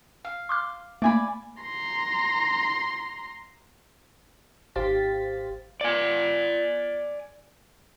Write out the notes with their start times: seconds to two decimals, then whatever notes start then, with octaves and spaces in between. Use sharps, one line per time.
0.25 F5
0.49 C6 D6 F6
1.02 A3 A#3 D5 G#5 B5
1.63 A#5 C6
4.75 G#1 G4 C5 F5 A6 B6
5.81 D5 G#5